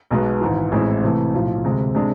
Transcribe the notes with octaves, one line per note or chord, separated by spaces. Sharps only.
B1 B2 G#3 B3
G#1 G#2 E3
A1 A2 G#3 C4 E4
C3 E3 A3
B1 A2 F3
D2 C3 G#3
C3 G#3 D4